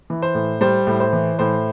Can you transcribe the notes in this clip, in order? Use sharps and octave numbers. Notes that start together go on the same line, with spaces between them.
E3
C5
A2
G3 C5
A2
C5
E3
A2 C5